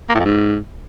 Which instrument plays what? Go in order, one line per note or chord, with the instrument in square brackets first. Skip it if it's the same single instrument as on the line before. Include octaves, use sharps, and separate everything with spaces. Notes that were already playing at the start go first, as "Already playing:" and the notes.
[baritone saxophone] A#3
A2
F2
G#2